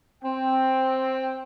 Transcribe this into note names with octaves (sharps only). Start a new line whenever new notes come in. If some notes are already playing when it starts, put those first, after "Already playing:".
C4 G5